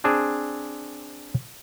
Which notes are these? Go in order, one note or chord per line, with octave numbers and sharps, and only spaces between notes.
C4 D4 G#4